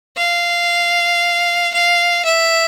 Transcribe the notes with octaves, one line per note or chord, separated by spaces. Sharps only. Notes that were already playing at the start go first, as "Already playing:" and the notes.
F5
F5
E5